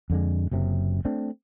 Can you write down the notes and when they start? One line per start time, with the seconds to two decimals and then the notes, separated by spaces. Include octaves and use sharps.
0.10 F2 D3 G#3
0.52 F#1 F#2 C3
1.05 A3 C4 D4